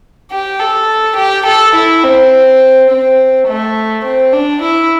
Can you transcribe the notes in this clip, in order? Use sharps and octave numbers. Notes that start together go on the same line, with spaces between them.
G4
A4
G4
A4
E4
C4
C4
A3
C4
D4
E4